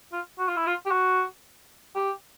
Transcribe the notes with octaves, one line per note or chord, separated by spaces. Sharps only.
F4
F#4
F4
E4
F4
G4
F#4
G4